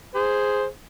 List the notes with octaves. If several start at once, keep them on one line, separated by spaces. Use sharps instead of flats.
G#4 C5